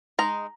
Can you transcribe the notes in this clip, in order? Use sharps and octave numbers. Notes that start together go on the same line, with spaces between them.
G#3 D#4 A#5